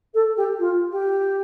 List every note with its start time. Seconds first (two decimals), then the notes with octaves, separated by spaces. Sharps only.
0.14 A4
0.36 G4
0.58 F4
0.91 G4